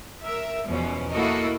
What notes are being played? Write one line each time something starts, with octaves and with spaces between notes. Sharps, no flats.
A#4 E5
E2 B2 F3 C#4
A#3 E4 F#4 A4 A#4 D#5